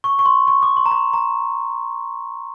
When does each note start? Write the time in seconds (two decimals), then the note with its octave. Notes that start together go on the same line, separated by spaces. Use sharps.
0.04 C#6
0.19 C#6
0.26 C6
0.48 C#6
0.63 D6
0.77 C6
0.86 A#5
0.91 B5
1.13 A#5